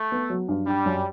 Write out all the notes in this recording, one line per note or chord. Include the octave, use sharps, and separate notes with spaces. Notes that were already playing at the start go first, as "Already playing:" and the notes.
Already playing: A3
B3
F#3
G2
G3 D4
F#2